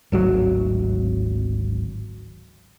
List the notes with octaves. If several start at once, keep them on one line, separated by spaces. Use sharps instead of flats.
D1 G#1 F#3